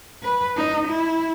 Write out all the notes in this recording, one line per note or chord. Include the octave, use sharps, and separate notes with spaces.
B4
D#4
E4